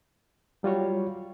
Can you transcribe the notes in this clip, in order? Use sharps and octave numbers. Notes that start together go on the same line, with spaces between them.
F#3 G3 F4 F#4 C#5